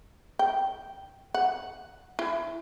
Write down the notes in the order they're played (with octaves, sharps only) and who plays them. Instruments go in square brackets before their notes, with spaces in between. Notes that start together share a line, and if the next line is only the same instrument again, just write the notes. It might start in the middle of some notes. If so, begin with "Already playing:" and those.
[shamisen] G5
F#5
E4